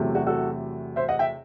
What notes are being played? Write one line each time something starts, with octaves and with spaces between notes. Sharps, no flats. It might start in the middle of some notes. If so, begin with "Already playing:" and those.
Already playing: E2 C3 F#3 A3
F#4
F#4 A4
C5 E5
D#5 F#5
E5 G5